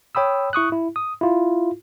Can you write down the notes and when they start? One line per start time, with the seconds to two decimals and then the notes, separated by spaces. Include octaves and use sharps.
0.15 C#5 G5 B5 D#6 E6
0.53 E4 C#6 D#6 F#6
0.72 E4
0.96 D#6
1.21 E4 F4